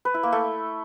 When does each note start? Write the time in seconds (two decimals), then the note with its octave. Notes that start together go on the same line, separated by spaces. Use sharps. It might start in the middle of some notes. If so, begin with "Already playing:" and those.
0.05 B4
0.14 E4
0.23 A#3
0.32 A3